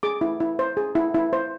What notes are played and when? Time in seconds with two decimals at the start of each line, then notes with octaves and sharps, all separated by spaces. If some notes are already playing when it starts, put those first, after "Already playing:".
0.03 G#4 D6
0.21 E4
0.40 E4
0.59 C5
0.77 G#4
0.95 E4
1.14 E4
1.33 C5